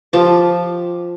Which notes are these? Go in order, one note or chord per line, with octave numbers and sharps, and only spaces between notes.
F3 G4 A5 D6